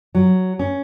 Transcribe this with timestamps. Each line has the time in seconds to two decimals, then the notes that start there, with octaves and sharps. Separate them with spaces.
0.15 F#3
0.59 C#4